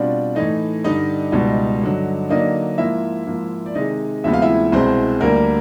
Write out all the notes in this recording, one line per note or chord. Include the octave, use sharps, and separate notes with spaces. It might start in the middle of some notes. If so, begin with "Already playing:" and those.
Already playing: B2 G3 C4 D4 F4 D5
A2 E3 A3 D#4 D#5
G2 D3 G3 D#4 D#5
C#2 B2 G3
G2 D3 F#3
D3 F#3 A#3 D4 D#4 D#5
G#2 F3 A#3 E4 E5
G#2 F3 A#3
D5
C3 D#3 G#3 D#4 D#5
D2 C3 F3 G#3 B3 E5
F5
E4 E5
C2 B2 G#3 C4 E4 C5
D2 D3 G3 A#3 A#4